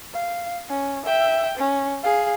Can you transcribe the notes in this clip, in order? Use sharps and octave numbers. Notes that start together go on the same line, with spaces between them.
F5
C#4
E5 G5
C#4
G#4 F5